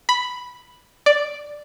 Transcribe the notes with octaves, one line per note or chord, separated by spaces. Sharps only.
B5
D5